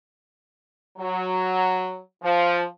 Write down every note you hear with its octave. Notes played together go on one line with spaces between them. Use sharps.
F#3
F3